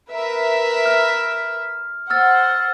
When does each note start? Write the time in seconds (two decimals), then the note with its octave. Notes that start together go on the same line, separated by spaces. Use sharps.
0.10 A#4 B4 E5
0.86 F6
2.10 C5 F#5 E6 F6 A6